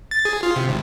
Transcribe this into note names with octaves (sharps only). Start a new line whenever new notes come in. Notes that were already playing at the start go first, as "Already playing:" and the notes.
A6
G#4
F4
C3
G#1